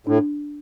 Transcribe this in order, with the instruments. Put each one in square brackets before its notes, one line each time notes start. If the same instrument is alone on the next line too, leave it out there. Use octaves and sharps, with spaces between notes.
[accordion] A2 [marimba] D4